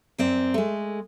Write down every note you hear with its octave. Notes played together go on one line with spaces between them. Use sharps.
F#2 C4 D5
G#3 A3